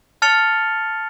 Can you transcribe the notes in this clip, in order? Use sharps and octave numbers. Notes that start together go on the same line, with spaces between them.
A5 F6 A6 C#7 F7 G7